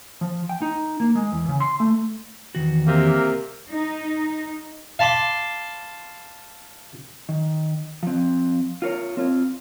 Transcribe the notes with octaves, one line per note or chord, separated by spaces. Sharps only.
F3
G5
D#4
A#3
G#3
E2
C#3
C6
A3
E2 D#3 F#4
C3 A#3
D#4
F5 A5 B5 C6 D6
D#3
F3 C4
F4 A#4 C#5
C4 F4